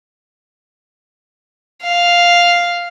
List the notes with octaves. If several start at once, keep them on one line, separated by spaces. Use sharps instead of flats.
F5